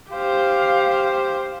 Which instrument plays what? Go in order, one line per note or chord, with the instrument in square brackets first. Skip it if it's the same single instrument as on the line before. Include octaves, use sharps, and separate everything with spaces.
[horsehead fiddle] G4 C5 [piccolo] F5